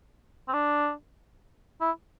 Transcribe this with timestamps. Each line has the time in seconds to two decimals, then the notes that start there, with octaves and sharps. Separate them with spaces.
0.48 C4
0.54 D4
1.81 E4